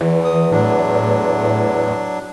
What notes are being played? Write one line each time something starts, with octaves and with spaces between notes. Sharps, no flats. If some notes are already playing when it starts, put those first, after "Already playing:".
E2 E3
D#6
A2 F#3 D4